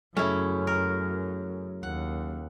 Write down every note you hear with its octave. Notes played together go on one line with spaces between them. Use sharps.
F#2 C#3 F#3 A3 C#4 E4
A#4
D#2 F#5